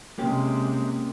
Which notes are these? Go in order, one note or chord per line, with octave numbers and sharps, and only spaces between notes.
C3 G#3 A#3 C#4 G4